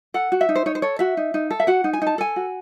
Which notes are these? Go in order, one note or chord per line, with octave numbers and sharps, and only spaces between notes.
A4 F#5
F#4
E5
D#4
C5
D#4 C#5
C5
A4 C#5
F#4 E5
D#4
D#4
A4
E5
F#4 F#5
D#4
G#5
D#4 A5
A4 G#5
F#4